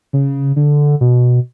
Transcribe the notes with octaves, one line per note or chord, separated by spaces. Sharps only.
C#3
D3
B2